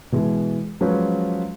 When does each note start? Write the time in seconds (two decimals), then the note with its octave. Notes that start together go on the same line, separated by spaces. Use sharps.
0.12 B2 E3 G#3
0.81 F3 F#3 G#3 C#4 B4 C#5